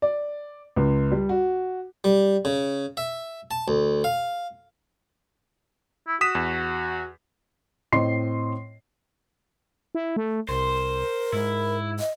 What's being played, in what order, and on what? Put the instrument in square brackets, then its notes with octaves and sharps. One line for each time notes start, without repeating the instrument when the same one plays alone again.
[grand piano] D5
C#2
G3
F#4
[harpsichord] G3
C#3
E5
A5
D2
F5
[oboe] E4
[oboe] F#4 [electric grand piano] D#6 B6 E7
[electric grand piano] E2
[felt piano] A2 C4 D#5 C6 C7
[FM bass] E4
A3
[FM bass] C2 [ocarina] A#4 [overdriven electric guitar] C5
[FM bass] G#2 [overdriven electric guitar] E4
[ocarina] D#5